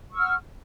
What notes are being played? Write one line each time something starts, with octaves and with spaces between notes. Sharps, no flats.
F#5 C#6 E6 F6